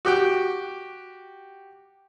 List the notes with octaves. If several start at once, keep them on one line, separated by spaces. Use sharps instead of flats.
F#4 G4 G5